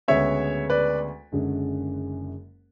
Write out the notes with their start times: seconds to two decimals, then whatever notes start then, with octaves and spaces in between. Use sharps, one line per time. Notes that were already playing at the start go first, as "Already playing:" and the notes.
0.08 D2 C#3 G#3 B3 C#5 E5
0.70 B4 D5
1.32 F#1 F#2 D3 G#3 C#4